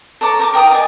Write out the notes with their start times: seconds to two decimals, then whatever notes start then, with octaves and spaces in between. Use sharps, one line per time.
0.21 A4 C#5 A#5 D6
0.40 A#4 A#5 D6
0.54 A#4 G5 A#5 D#6
0.70 D5 D#5 G#5